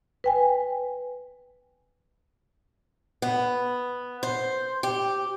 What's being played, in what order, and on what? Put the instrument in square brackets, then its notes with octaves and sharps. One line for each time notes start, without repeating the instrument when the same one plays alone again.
[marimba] B4 G5 G#5
[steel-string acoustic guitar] B3
C5
G4